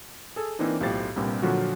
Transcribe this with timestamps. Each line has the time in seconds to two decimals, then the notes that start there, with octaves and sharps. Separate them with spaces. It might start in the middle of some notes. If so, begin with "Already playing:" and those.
0.36 G#4 A4
0.59 E3 A#3 C4 D4 D#4
0.81 B1 A2 F4 G4 C5 A6
1.16 C2 G2 A#2 C4
1.42 A#2 D3 F3 F#3 F4 F#4